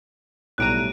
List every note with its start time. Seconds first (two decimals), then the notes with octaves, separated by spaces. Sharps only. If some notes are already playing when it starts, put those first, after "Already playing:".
0.58 B1 A2 G3 A#5 F#6 D7 D#7